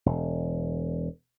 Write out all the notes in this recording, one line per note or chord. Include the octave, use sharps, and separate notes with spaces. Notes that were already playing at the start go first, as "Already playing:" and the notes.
E1